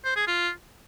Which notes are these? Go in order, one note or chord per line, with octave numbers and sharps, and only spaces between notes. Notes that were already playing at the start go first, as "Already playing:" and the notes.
C5
G#4
F4